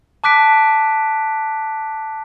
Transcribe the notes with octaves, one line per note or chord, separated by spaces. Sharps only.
A5 D6 F#6 B6 D7